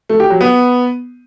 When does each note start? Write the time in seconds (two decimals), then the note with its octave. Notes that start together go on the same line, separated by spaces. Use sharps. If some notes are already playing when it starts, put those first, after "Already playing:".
0.09 A3
0.20 G4
0.30 F#3
0.41 B3